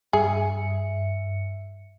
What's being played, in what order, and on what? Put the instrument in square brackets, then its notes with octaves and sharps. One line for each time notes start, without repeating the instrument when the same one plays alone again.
[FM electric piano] G2 E5 C#7 [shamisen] G#4